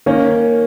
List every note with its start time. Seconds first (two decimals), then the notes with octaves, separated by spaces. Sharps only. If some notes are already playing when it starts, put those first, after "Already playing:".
0.06 D#3 A#3 C#4